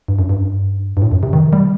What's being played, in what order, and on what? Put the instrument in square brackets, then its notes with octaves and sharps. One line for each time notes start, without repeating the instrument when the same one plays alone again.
[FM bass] G2
F#2
G2
G2
A2
F#2
C3
D#3
G3